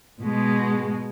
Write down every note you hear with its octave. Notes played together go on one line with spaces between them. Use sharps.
B2 G#3